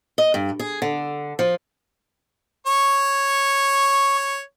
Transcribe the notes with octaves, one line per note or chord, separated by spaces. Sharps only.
D#5
G2
G#4
D3
F3
C#5 C#6